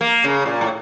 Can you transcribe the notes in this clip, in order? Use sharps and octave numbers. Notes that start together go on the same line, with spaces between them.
A#3
C#3
A#2
A2